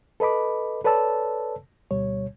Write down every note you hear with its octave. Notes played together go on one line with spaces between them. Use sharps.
A4 B4 D#5 B5 D6
A4 B4 C#5 D5 A5 E6
D2 B2 G3 C#5